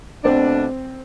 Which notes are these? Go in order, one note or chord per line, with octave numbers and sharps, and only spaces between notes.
B2 A3 C4 D4